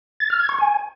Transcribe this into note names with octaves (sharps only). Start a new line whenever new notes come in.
A6
F6
G#6
C#6
G#5